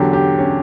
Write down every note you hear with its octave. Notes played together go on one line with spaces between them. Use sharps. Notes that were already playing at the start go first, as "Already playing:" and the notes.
Already playing: E2 D3 F#3 G4
G4
C#4